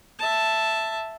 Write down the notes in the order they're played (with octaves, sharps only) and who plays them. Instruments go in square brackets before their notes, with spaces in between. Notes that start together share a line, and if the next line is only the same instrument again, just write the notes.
[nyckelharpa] E5 A5